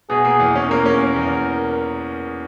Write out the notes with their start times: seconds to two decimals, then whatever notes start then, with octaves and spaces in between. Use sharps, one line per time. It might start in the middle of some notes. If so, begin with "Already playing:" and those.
0.10 B2 G#4
0.25 A#3
0.40 E2
0.55 C#4
0.70 A#3 A#4
0.86 C#4
1.01 A#3
1.16 E2